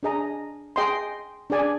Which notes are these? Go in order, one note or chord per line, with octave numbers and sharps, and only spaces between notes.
D4 G#4 D#5 A#5
G#4 D#5 G5 C6
D4 G#4 D5 G#5